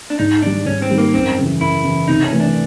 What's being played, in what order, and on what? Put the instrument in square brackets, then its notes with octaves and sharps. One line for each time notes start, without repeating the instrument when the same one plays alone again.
[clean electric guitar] D4
[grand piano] G#2 [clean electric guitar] D#4
[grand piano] D#3 G3 [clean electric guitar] D4
[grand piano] G#2 [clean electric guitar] C#4
[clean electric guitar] C4
[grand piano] D#3 G3
[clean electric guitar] A#3
[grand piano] F#2 [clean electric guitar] C4
[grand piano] C#3 E3
[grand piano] F#2 [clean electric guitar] E4
[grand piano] C#3 E3
[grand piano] C3 [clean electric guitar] D#4
[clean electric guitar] C#4
[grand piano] E3 A3
[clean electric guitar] D4